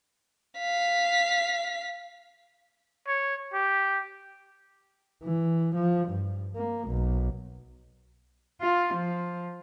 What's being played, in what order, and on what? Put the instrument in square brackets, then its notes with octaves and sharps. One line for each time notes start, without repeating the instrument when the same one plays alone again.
[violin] F5 B6
[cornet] C#5
G4
[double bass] E3
F3
G2
A#3
B1
[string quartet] F4
F3